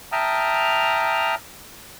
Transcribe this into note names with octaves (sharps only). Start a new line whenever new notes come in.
E5 G5 A5 A#5 D#6 F6